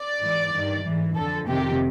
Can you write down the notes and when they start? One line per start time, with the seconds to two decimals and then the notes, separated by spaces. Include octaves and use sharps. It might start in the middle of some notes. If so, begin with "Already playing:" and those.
Already playing: D5
0.21 G#2 E3
0.53 G2 D#3
0.85 G#2 E3
1.15 F2 D3 A4
1.47 F2 C3 D#3 G4